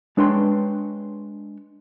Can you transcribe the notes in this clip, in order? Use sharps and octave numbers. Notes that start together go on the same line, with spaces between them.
G#3 D4 B4 C#5 G5 C6